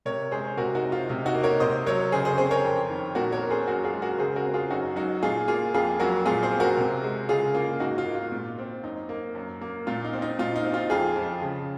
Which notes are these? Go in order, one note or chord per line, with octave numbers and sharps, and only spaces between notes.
C3 A#4 C#5
G#3 G#4 C5
C5
C3 F#4 A#4
D#4 F#4
C4
F4
C3 D#4
D#4 F#4
A#3
A#4 C#5
C3 C5 D#5
F#3 A#4 C#5
C#3 G#4 C5
G#4 C5
C4 G#4 C5
A#4 C#5
F2
D#3
A#2 F#4 A#4
A#4 C#5
C4
G#4 C5
F#2 F#4 A#4
F4 G#4
G#3
F#4 A#4
C#3 G#4 C5
F#4 A#4
C4
F4 G#4
F#2 D#4 F#4
F#3 D#4 F#4
A#2 F4 G#4
A#3 F4 G#4
F2 F4 G#4
F#3 F#4 A#4
A#2 F4 G#4
G#4 C5
C4
F#4 A#4
C3
G#3
C#3 F4 G#4
A#3 F4
G#2 D#4 F#4
F4
A#3
F4
A#2
C4
F#2 D#4
A#3
F#2
A#3
A#2 F4
D#4
C4
D#4
A#2 F4
D#4
C4
F4
F2 F4 G#4
F3
C#3